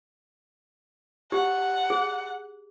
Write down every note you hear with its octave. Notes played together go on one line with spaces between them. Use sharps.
G4 F#5
G#4